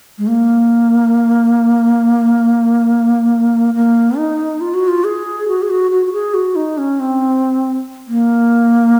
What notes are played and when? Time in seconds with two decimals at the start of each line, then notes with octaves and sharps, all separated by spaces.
0.18 G#3
0.27 A#3
3.75 A#3
4.17 D#4
4.61 F4
4.74 F#4
4.88 F4
5.04 G#4
5.48 F#4
5.62 G#4
5.70 F#4
5.91 F#4
6.06 F#4
6.13 G#4
6.34 F#4
6.56 D#4
6.78 C#4
7.00 C4
8.08 A#3